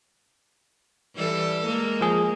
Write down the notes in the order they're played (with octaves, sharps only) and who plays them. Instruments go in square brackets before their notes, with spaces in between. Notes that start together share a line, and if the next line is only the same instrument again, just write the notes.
[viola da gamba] E3 G3 A4
G#3 A#3
[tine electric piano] F3 G#4